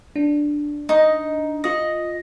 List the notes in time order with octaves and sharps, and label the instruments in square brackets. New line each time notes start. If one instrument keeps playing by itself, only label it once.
[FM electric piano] D4
[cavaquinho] D#4 D#5
[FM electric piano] F4 A#6 [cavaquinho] D#5